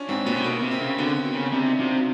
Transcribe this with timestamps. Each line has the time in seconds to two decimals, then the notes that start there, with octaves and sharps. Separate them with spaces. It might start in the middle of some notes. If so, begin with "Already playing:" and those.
Already playing: C#4 D4 F4
0.09 G#2 C4
0.26 A#2 B3
0.37 C3
0.44 B2 A#3
0.62 C3
0.71 C4
0.81 C#3
0.98 D3 B3
1.25 A#3
1.34 C#3
1.52 C3 D4
1.66 D#4
1.80 C3 F4
1.93 F#4